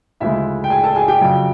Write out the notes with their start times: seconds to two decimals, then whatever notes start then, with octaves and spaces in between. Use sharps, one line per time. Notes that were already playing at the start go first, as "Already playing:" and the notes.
0.20 D2 C#3 F3 G#3 E4 E5
0.64 G5
0.70 G#4 G#5
0.83 A4 A5
0.95 G#4 G#5
1.08 G4 G5
1.21 F2 C#3 F#3